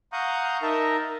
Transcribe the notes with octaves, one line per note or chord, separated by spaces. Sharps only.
F5 F#5 A#5 C#6 D#6 G6
D#4 A#4 D#5 E5 A5